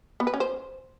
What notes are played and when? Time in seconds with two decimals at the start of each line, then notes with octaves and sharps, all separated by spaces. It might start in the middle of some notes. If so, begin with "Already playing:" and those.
0.20 B3
0.27 B4
0.34 C#4
0.40 C5